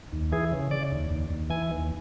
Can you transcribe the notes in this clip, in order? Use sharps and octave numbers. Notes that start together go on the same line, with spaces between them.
D#2
E3 G#4
C#3
C#3 D5
D#2
D#2
D#2
E3 G#5
D#2